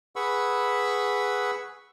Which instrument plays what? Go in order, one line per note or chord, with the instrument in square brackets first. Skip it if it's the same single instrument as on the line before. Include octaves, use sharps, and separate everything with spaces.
[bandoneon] G#4 B4 F#5 B5 C#6 E6